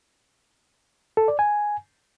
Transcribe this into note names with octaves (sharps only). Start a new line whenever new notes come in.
A4
D5
G#5